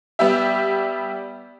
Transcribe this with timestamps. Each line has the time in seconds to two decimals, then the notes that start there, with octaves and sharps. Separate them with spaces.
0.19 G3 B3 G4 E5